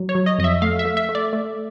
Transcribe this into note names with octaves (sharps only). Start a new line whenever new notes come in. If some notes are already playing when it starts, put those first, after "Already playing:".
Already playing: F#3
C#5
F#3
D#5
F2 D#5
E5
A3 F5
E5
A3
E5
A3
D5
A3